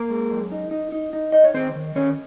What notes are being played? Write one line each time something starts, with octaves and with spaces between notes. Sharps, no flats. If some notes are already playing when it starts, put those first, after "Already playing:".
Already playing: A#3 A#4
G#3
F#2
D#4
D#4
D#4
D#4
D#4 D#5
C#5
D#3 C4 C5
D#3
D#3 C#4 C#5